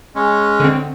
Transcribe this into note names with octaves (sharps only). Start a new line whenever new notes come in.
G#3 C#4
D3 C4